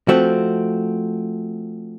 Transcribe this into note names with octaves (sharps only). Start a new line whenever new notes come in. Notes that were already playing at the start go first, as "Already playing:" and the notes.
F3 A3 C4 F#4